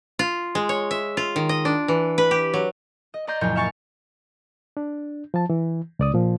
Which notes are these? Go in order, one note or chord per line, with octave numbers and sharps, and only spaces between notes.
F4
G#3
C#5
E5
F4
D#3
D#5
D4
E3
B4
G4
F#3
D#5
D5 D#5 A#5 C6 G6
F#1 A#2 F3 C#5 G5 G6
E5 F5 G#5 C#6 F6 A6
D4
F3 A5
E3
C#2 D5 D#6
A#2 F3